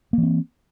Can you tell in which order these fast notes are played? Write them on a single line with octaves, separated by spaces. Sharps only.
A#3 E3 C4